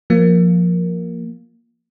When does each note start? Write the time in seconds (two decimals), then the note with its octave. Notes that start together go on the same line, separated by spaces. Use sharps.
0.10 F3 A#3